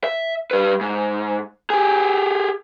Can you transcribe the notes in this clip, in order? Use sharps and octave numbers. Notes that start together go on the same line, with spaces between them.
E5
G3 B4
G#2
G4 G#4